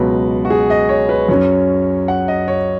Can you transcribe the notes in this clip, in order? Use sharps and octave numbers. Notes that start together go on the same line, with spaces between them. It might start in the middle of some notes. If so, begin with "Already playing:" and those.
Already playing: C#2 B2 F#3 B4
F#4
G#4
D#5
C#5
B4
F#2 F#3 C#4 C#5
F#5
D#5
C#5